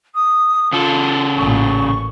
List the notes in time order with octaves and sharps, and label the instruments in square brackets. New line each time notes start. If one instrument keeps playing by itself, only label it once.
[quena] D#6
[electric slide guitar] C#3 A4 [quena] F4
[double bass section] A1 A#2 [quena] C#6